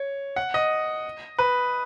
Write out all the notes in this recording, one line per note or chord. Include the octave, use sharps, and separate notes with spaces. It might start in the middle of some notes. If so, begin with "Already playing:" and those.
Already playing: C#5
F#5
D#5
B4